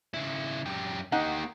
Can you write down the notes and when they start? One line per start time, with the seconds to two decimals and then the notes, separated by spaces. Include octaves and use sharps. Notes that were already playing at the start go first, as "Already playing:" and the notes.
0.14 C#3 E4
0.66 F#2 G4
1.12 A#3 D#4 G4 F#5